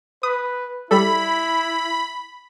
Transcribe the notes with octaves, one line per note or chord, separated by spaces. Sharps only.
B4 D#6
G3 E4 A4 B5